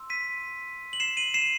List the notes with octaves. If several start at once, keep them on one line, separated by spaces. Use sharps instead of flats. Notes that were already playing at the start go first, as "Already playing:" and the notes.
Already playing: C6 E6
B6 D#7
F#7
C7 E7
D#7 F#7
C7 E7